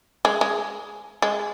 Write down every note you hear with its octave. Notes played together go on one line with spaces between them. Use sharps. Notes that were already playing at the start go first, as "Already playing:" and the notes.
G#3
G#3
G#3